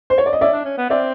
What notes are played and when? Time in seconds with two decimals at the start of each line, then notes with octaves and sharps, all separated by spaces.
0.10 C5
0.18 C#5
0.26 D5
0.33 D#5
0.41 C#4 D5 E5
0.53 D4
0.65 C#4
0.78 B3
0.90 C4 D5 E5